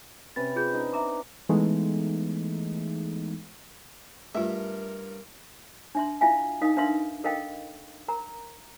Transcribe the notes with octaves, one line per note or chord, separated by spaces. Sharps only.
C3 C#4 B4 A6
F4 G#4 G6
D4 D#4
E5 A#5 D6
E3 G#3 A3 B3 D#4
G2 A3 F4 A#4 E5
D4 E5 C6
E4 F4 E5 F5 G#5
D#4 A#4 D#5 F5 D#6
D4 A#4 B4 E5 F5 C6
A4 A#4 D#5 F5 G5
A#4 A#5